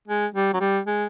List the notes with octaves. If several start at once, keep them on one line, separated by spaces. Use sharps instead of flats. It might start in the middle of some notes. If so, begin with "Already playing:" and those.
G#3
G3
F#3
G3
G#3